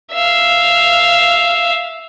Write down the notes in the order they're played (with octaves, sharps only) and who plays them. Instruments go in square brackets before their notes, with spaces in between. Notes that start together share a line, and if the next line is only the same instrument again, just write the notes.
[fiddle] E5 F5